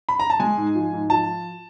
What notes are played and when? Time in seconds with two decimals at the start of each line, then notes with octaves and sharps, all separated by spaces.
0.09 B5
0.20 A#5
0.30 A5
0.40 G#3 G#5
0.57 G#2
0.75 F3
0.93 G#2
1.10 F3 A5